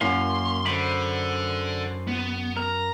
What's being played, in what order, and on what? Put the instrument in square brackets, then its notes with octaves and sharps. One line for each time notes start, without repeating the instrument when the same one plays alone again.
[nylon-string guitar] F#2 [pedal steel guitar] A#3 C#4 F5 [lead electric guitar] C6
[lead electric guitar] D3 [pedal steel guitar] C5 B5
[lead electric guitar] B3
[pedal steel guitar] A#4 [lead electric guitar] A#5